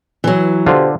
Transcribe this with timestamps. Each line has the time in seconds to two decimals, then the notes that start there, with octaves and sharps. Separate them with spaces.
0.24 E3 F#3
0.66 B2 D3 F4 G4 C5